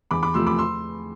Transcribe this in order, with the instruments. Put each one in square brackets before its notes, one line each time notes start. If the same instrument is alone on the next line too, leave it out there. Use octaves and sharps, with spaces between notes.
[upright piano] E2 B5 D6
B5 D6
C3 F3 A3 C6 E6
B5 D6
C6 E6